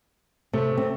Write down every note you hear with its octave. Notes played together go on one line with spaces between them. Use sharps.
C3 A3
C4